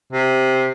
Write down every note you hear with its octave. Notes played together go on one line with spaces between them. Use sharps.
C3